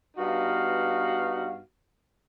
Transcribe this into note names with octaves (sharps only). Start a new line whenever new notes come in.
G2 B3 D#4 F#4 F5